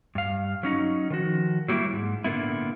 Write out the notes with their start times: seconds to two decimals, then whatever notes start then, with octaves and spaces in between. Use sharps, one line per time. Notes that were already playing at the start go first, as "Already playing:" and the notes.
0.15 G2 F5
0.63 F#3 C#4 D#4
1.10 D#3 F3 F#4
1.69 F#3 G3 A#3 D#4 E4
1.93 G#2
2.24 A#2 D3 A#3 B3 E4